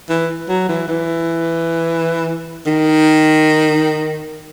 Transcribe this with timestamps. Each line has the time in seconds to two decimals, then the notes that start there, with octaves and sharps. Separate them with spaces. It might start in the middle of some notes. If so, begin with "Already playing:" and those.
0.09 E3
0.48 F#3
0.69 E3
0.88 E3
2.67 D#3